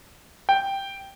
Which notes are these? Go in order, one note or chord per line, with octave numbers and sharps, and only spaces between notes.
G5